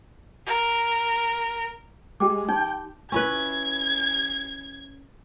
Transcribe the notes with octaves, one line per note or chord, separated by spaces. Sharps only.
A#4
G#3 G4 G5 D6
D#4 G5 C6
C#4 E4 B4 G#6